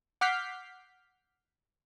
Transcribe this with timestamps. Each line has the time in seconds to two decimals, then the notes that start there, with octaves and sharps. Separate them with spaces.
0.21 F#5 D6 F6 G6 B6 C7